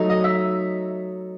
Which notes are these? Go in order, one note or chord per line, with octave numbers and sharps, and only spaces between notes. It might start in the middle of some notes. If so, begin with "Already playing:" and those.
Already playing: F#3 A3 D#4
D#5
E5